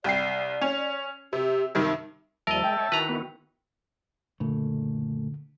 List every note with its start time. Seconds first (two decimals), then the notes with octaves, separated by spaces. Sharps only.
0.04 C2 D5 G5 C7
0.62 C#4
1.33 C3 G4
1.75 G2 C3 D#3 D#4
2.47 D#2 F3 G3 A#4 D#5 E5 A5
2.64 G#3 G5
2.77 C#5
2.92 D#3 E4 F#4 B4 A#5
3.09 B3
4.40 F#1 A#2 D3 A3